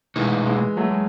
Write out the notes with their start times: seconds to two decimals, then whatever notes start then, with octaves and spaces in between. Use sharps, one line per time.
0.16 B2 E3 G#3 A3 D#4
0.46 E3 G#3
0.77 F#3 A3
0.91 G#3